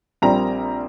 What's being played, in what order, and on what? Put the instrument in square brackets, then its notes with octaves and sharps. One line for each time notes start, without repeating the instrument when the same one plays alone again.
[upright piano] A#1 A#2 G3 C4 A#5